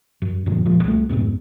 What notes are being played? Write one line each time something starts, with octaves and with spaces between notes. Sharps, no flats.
F#2
F#2 A#2 D3 F3
E1 A#2 F3
C2 A3
A#1 F2 G#2 B2